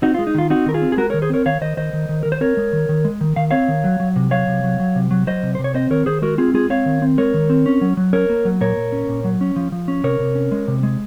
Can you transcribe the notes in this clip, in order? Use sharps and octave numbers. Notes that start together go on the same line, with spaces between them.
C4 D#4 F#4
F4
G#3
D#4
D#3 F4
C4 D#4 F#4
D#3 A#4
F4 G#4
C4
G#4
G#3 F#4 A#4
A#4 C#5
D#3
G#4 C5
C4 A#4 C#5
D#3 C#5 F5
D#3 C5 D#5
D#3 C5 D#5
D#3
D#3
D#3 A#4
C5
C4 A#4 C#5
G#3
D#3
D#3
G#3
D#3
D#3 F5
C4 C#5 F5
D#3
F#3
F#3
C3
F#3 C#5 F5
C3
F#3
F#3
C3
F#3
F#3 C5 D#5
C3
C3 C5
C#5
C4 C5 D#5
D#3 A#4 C#5
D#3 G#4 C5
G#3 F#4 A#4
C4 F4 G#4
G#3 F4 G#4
C4 C#5 F5
D#3
C4
G#3 A#4 C#5
D#3
C4
C#4
F#3
F#3
C#4 A#4 C#5
A#3
F#3
A#2 A#4 C#5
A#2
C#4
A#2
F#3
C#4
F3
F3
C#4
C3 A#4 C#5
C3
C#4
G#3
C3
G#3